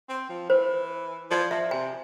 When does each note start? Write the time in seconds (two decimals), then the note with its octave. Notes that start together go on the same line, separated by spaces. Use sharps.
0.09 C4
0.29 F3
0.49 E3 C5
1.31 F3 D5
1.51 F3 E5
1.71 C3 G#5